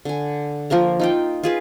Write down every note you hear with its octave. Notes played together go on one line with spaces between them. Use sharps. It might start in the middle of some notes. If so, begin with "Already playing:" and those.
D3 G#5
F3 A#3 A#4 A#5
D#4 F4 G5
F4 G#4 B4